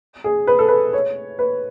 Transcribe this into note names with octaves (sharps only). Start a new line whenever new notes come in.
G#4
B4
A4
B4
C#5
B4